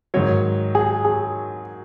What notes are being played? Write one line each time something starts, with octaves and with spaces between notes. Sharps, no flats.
G#2 D#3 F#3 C#5
G#4
G#4